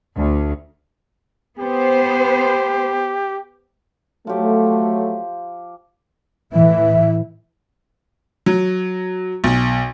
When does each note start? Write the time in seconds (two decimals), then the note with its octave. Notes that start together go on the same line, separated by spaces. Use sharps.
0.16 D2
1.59 B3 G4 C5
4.27 F3 F#3 A3 G4
6.53 A2 E3 E5
8.46 F#3
9.44 B1